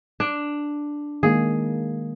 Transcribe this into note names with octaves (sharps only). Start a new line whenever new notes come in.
D4
D#3 G#3 A#3 G#4